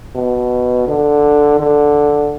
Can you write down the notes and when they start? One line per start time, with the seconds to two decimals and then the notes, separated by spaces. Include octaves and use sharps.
0.15 B2
0.88 D3
1.60 D3